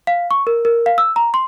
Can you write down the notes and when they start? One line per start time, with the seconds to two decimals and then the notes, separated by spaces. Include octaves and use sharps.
0.07 F5
0.31 C#6
0.47 A#4
0.65 A#4
0.86 F5
0.98 E6
1.16 A#5
1.34 C6